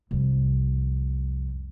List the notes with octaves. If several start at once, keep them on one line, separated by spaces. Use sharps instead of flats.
C2 F2